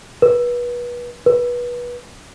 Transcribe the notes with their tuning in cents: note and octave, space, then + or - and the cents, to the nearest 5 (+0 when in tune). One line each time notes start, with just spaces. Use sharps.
B4 -30
B4 -25